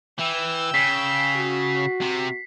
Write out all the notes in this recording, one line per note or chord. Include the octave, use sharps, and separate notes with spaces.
E3 G5 E6
C#3 B6 C7
F#4
C3